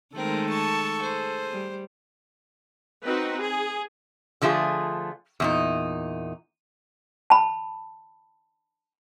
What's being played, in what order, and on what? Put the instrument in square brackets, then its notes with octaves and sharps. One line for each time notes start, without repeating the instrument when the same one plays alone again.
[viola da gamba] D#3 G#3 A3 [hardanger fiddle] C4 A#4 [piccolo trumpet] A4
[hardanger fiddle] A5 C#6
[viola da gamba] G#4 [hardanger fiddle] C5
[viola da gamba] G3
[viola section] C4 D#4 F#4 B4
G#4
[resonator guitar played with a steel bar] D3 F3 A3 F4 G#4
E2 A#2 D#4
[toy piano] A5 B5